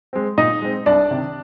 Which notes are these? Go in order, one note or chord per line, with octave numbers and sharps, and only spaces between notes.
G#3 C4
A#2 D#4 D#5
G#3 C4
C2 D4 D5
C3 D#3